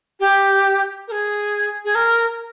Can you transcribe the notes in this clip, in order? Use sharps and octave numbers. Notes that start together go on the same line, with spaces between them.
G4
A#4
G#4
G#4
A#4